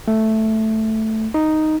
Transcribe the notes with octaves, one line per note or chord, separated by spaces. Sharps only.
A3
D#4